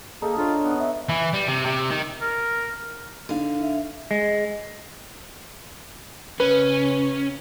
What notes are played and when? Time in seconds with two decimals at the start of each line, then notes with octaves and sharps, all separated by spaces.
0.22 A#3 D#4 G#4 A4
0.37 D4 F4 C#5 G#5
0.62 B3
0.79 E5
1.09 E3
1.34 G3
1.48 C3
1.66 C3
1.90 D#3
2.21 A#4
3.29 D3 D#4 F5
3.62 E5
4.11 G#3
6.40 C#3 C#4 B4